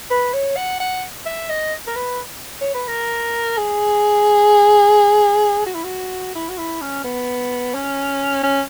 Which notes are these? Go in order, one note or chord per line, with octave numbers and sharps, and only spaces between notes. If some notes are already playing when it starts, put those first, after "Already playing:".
B4
C#5
F#5
F#5
E5
D#5
A#4
B4
C#5
B4
A#4
G#4
F#4
E4
F#4
E4
F#4
E4
C#4
B3
C#4
C#4